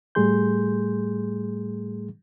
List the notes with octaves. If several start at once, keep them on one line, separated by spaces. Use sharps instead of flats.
A2 G3 A3 G#4 C6 G6